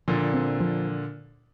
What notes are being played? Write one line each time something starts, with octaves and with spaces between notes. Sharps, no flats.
A#2 D3 F3
C4
F3